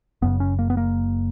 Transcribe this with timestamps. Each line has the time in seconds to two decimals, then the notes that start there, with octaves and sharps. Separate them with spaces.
0.22 F#1 F#2 C#3 B3
0.40 C#4
0.59 A#3
0.70 B3
0.77 A#3